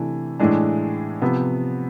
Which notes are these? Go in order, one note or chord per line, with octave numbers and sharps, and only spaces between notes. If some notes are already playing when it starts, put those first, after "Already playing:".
Already playing: C3 E3 A3 D4
A2 E3 G#3 D4
C3 F3 B3